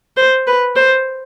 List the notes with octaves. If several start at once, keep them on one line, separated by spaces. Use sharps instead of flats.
C5
B4
C5